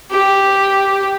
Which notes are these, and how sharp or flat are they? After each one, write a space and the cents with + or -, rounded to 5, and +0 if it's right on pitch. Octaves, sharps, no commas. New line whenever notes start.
G4 +0